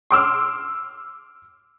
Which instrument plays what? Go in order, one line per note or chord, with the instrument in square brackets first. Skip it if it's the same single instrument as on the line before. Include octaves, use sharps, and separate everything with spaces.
[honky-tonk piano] C6 D6 E6 F6